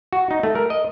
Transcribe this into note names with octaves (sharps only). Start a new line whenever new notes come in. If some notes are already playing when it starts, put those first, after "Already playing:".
F#4
D#4
A3
A#4
D#5